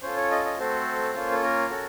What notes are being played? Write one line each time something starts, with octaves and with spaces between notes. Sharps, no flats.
C#4 F4 A4 C5
C#5
D#5
D#5
A3 C4 F#4 A4 C5
A#3 C#4 F4 A4
A4
A#4
C#4 F#4 A4